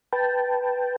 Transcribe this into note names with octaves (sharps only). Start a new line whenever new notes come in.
B4 G5 A5